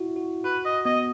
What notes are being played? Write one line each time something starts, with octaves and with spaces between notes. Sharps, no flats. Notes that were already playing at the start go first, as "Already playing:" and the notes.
Already playing: E4 F#4
F#4
F#4 B4
D#5
B3 D#5